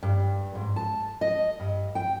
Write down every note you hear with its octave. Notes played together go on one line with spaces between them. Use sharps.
G2
G#2
A5
D#5
G2
G5